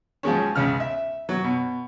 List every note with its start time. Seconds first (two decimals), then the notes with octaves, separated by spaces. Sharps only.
0.23 F3 F#3 G#3 C#4
0.55 C#2 C#3 F6
0.80 E5
1.29 F#3
1.44 B2